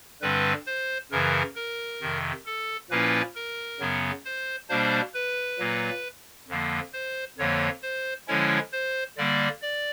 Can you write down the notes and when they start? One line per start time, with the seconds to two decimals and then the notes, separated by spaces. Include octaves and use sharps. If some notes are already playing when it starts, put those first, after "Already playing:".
0.22 G2 D3 G3 C4 B4
0.67 C5
1.11 F#2 C#3 E3 A#4
1.56 A#4
2.01 F2 C3 D#3
2.46 A4
2.90 A#2 F3 A#3 C#4 E4 B4
3.36 A#4
3.80 F#2 C#3 F#3 B3
4.25 C5
4.69 B2 G3 A#3 D4 C5
5.14 B4
5.59 A#2 F#3 A#3
6.48 F2 D3 F3 A#3
6.93 C5
7.38 F2 D3 F3 A#3 C#5
7.82 C5
8.28 D3 F3 G#3 C#4 E4 C#5
8.72 C5
9.17 D3 G3 A#3 D5
9.62 D5